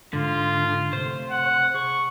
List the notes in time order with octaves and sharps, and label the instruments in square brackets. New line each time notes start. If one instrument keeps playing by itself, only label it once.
[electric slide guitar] G#2 [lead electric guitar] D3 [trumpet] F4
[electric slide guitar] C3 A3 [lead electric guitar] C5
[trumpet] F#5
[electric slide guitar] G#4 [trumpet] C#6